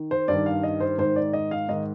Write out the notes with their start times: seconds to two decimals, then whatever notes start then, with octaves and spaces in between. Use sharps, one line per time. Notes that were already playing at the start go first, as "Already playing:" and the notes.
Already playing: D#3
0.11 C5
0.28 G2 D#3 D5
0.46 F5
0.63 D#5
0.80 C5
0.98 G#2 D#3 C5
1.16 D5
1.33 D#5
1.51 F5
1.68 G#2 D#3 D#5